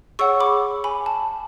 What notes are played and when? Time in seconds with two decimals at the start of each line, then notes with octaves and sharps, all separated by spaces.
0.19 G#4 C#5 F#5 C#6 E6
0.40 B5 D6
0.84 G#5 B5
1.06 A5